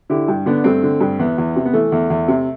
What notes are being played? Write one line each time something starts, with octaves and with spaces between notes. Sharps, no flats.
D3 E4 G4
G2
D3 B3 D4
G2 A3 C4
D3
G2
E2 B3
E2
C3
B3
E3 A3
E2
E2
C3